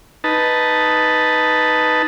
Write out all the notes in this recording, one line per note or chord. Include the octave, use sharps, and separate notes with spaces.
D#4 B4 A5